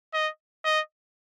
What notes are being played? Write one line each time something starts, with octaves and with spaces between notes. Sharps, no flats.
D#5
D#5